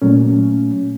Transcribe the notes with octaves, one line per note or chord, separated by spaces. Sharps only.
A#2 F#3 A3 C#4